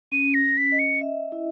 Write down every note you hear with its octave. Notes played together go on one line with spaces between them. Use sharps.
C#4 D#7
A#6
C#4
B6
D#5
C#7
E5
E4